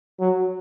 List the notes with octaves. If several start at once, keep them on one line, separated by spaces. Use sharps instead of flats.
F#3